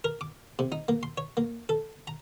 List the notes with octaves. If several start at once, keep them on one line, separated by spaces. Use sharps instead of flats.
A#4
D6
C3
D#4
A#3
C6
C#5
A#3
A4
A#5